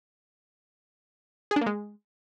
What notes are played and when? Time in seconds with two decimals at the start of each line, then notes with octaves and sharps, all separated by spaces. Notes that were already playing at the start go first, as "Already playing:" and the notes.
1.51 G#4
1.56 D4
1.61 A#3
1.66 G#3